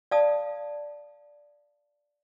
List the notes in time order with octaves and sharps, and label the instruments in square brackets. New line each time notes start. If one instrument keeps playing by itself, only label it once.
[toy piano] D5 F5 A5 D#6